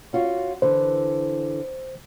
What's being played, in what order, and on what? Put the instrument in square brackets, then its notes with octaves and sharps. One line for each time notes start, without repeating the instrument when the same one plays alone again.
[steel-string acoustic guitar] C#4 F4 F#4
[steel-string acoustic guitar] D3 E3 [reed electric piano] C5